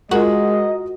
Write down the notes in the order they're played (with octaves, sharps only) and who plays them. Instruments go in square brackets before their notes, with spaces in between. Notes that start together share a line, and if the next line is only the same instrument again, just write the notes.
[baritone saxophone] G#3 [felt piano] F4 A#4 [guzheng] F#4 [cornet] D#5